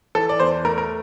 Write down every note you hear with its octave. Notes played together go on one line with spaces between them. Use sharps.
E3 A4
D5
E2 C5
A3 A#4
A#4